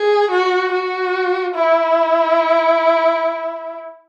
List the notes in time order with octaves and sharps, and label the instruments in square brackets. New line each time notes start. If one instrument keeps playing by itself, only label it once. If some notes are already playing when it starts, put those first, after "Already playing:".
Already playing: [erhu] G#4
F#4
F#4
E4